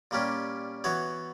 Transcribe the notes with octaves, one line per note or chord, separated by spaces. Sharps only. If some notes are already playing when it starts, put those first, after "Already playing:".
A#2 G3 A#3 C#4 G4
E3 B3 F#4 C#5